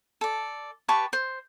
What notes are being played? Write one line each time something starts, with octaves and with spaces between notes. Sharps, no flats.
A4 D5
G4 B4 A5 C#6
C5